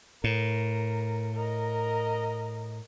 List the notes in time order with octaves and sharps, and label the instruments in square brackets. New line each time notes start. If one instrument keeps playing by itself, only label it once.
[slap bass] A2 [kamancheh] A#4
[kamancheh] A#4 D#5